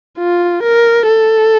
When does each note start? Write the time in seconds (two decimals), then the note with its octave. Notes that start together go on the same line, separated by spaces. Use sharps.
0.19 F4
0.63 A#4
1.08 A4